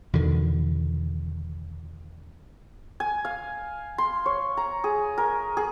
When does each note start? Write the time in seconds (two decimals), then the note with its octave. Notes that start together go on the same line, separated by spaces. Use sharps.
0.13 E2 B2 D3 D#3
3.00 G#5
3.25 F5
3.98 C6
4.26 C#5
4.57 A#5
4.84 G#4
5.18 A#4
5.57 G#4